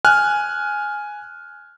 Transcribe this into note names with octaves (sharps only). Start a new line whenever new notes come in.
G#5 F6 F#6